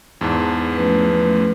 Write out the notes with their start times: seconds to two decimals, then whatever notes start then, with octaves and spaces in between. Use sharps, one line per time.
0.21 E2 G#2 A5
0.74 F3 A3 C#4 B4